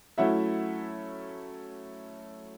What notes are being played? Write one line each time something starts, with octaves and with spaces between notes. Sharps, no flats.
F#3 A3 C#4 E4 E5 F#5